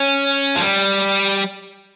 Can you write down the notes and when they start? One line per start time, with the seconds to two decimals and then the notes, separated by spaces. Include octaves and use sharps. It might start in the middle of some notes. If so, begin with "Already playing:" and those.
Already playing: C#4
0.56 F3
0.61 G3